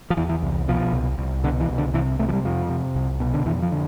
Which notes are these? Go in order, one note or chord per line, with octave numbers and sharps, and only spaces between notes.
F3
E2 E3
E3
C2
B2 F3
C2
C2
B2 D3
E3
C2
D3
C3 E3
C3 A3
F3
G3
F2 F3
C3
C2
B2
D3
F2 E3
F3
D3